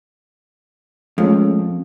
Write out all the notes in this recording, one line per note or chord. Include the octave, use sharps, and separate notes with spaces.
F2 G#3 A3 C#4